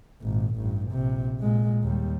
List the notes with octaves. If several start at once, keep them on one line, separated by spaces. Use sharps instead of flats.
G#1 A#2
A1 G2
A#1 C3
A#2 G#3
D#2 G3